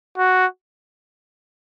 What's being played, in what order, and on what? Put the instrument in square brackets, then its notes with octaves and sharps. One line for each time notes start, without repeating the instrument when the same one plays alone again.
[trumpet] F#4